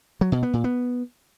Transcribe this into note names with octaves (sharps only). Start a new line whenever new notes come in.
F#3
B2
B3
A#2
B3